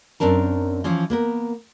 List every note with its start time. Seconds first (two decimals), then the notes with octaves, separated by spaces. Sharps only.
0.20 F#2 C4 D4 A#4 A5
0.84 E3 F3 C#4 F4
1.10 A#3 B3 A#4